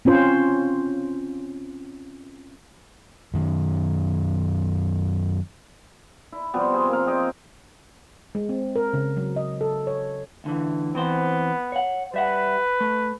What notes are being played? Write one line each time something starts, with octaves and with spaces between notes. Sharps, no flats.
C4 C#4 F4 C5
F#2 D#3
E4
C3 F3 G3 B3
C4 G#4
A#3 F5
C4 G#4 D#5 G5
G#3
C4
A#4
C#3
F#3
D#5
A4
C#5
D2 D3 E3
E3 B3 C4 C5
C#5 F#5
G3 B4 E5 F#5
A3